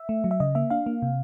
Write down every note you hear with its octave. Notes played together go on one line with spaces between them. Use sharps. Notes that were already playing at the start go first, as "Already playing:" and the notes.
Already playing: E5
A3
F#3
E5
C#3 D#5
A#3 E5
D4 F5
A#3
C3